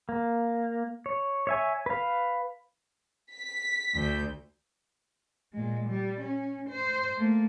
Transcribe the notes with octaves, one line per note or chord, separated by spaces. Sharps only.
A#3
C#5
C#5 E5 G#5
B4 F5
B6
D2 G6
A#2 G#3
G3
C#4
C5
A3 A#3